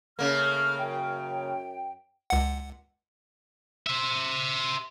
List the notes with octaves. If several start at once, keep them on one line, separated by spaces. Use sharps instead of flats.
C#3 A3 A#3 F6
F#2 G5
C#2 F#5
C5 E5